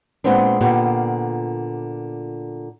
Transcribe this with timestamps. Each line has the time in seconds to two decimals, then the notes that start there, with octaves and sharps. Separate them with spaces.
0.24 A#2 D3 G#3 B3 C4 D4
0.61 A#2 D3 B3 F4 G4